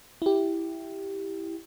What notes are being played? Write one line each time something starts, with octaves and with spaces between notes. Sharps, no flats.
E4 G4